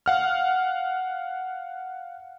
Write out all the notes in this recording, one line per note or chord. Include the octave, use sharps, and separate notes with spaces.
F5 F#5 F6